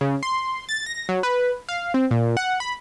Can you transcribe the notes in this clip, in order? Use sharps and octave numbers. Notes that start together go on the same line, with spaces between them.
C#3
C6
A6
A#6
F#3
B4
F5
C4
A#2
F#5
B5